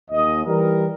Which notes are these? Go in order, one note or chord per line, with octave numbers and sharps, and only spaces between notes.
D#2 D#5
E3 G3 A#4